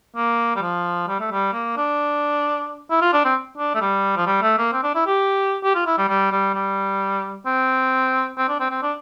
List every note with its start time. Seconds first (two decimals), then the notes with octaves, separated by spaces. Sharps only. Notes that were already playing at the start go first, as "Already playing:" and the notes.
0.16 A#3
0.56 G3
0.62 F3
1.08 G3
1.20 A3
1.31 G3
1.53 A#3
1.77 D4
2.91 E4
3.01 F4
3.13 D4
3.25 C4
3.58 D4
3.75 A3
3.81 G3
4.17 F3
4.26 G3
4.42 A3
4.58 A#3
4.73 C4
4.83 D4
4.95 E4
5.07 G4
5.63 G4
5.75 F4
5.86 E4
5.98 G3
6.09 G3
6.32 G3
6.55 G3
7.46 C4
8.38 C4
8.49 D4
8.60 C4
8.71 C4
8.83 D4